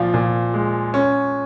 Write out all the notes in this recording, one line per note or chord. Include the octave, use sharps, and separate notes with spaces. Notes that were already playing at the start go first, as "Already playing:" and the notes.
Already playing: A#2 F3
A#2
G#3
C#4